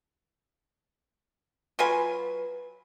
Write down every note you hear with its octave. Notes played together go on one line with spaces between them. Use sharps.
F#3 F4 B4 G#5